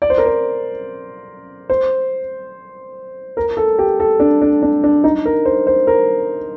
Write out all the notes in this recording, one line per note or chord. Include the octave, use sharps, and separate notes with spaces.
D5
C5
A#4
C5
C5
A#4
A4
G4
A4
D4
D4
D4
D4
D#4
A#4
C5
C5
A#4